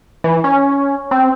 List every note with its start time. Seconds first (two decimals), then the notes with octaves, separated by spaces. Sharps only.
0.24 E3
0.44 C#4
1.11 C4